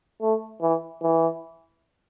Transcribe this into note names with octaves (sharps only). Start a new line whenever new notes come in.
A3
E3
E3